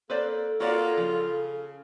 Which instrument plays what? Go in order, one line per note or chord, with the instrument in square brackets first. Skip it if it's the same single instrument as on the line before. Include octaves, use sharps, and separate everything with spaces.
[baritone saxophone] A#3 [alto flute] A4 [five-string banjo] B4 C5 D5
[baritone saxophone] A#3 [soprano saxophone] F4 [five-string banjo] F#4 D5 F#5
[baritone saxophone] C#3 [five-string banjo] F3